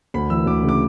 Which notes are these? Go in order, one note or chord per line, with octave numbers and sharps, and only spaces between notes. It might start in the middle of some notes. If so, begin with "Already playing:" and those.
D2 B5
E3 E6
D2 D6
C#3
D6